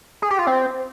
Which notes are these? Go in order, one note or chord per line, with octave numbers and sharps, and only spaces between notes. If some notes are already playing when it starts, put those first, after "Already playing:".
G#4
G4
F4
C4